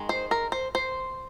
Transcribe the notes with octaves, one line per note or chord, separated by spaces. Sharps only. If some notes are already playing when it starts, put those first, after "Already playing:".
Already playing: D#3 G#3
C5
A#4
C5
C5